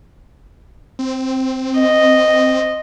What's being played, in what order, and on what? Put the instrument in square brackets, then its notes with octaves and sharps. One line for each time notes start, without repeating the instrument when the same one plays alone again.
[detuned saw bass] C4
[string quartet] D#5